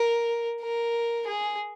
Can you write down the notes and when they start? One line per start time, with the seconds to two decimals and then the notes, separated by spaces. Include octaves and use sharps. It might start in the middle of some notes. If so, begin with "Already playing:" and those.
Already playing: A#4
0.62 A#4
1.27 G#4